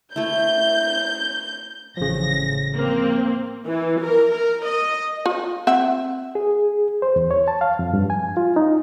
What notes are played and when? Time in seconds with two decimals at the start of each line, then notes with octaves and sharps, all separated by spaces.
0.16 A3 E4 G6
1.97 A1 C#3 F3 A#6
2.74 A#3 C4
3.65 E3
4.00 A#4
4.30 A#4
4.64 D#5
5.26 F4
5.67 C4 E5 F#5
6.35 G#4
7.02 C5
7.16 E2
7.31 C#5
7.48 A5
7.61 F5
7.79 F2
7.93 G2
8.10 G#5
8.37 F4
8.56 D#4